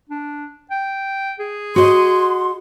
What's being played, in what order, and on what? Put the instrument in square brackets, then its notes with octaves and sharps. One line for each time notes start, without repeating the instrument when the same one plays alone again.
[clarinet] D4
G5
G#4
[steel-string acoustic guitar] F#4 D#5 [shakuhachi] C6